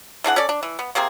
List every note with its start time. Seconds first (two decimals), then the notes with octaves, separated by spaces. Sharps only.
0.24 E3 D4 G#4 F#5
0.36 C#4 A4 D5
0.49 D4
0.63 E3
0.79 B3
0.95 C3 A#3 C4 G#4